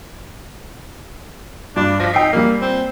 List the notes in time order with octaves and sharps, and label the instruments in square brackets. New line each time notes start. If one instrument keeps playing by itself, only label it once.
[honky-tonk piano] G2 [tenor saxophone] D4
[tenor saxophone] F3 [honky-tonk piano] A#6 B6
[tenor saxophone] D#4 [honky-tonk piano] G5 E6 C7
[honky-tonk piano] A#2 G3 [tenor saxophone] A#3
[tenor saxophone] C4